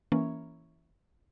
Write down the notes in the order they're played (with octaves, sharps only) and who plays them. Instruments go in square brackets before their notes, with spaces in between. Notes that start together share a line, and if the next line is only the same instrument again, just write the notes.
[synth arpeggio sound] E3 A#3 C#4